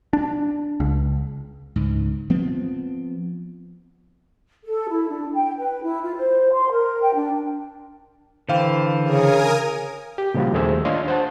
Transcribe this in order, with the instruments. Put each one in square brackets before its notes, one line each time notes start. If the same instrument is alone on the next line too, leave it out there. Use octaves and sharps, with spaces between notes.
[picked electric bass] D4
C#2
[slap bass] C#2 G#2
F3 B3 C4
[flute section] A4
E4
D4
G5
B4
E4
F4
C5
C6
A#4
G5
D4
[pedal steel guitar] D3 E3 [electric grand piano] C5 F5 G5
[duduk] C#3 [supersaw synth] A#4 G#5 D#6
[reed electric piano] G4
A#2 C#3 F3 G3 F4 F#4
D#2 A3 A#3 G#4 C5 E6
D4 F4 C#5 D#5 F5 C6
C5 F#5 A5